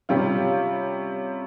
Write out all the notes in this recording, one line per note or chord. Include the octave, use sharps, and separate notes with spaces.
C3 G3 C#4 F4